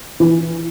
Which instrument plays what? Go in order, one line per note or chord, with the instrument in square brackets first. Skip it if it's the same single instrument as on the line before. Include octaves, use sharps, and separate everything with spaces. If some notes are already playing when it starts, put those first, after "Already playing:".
[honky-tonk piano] E3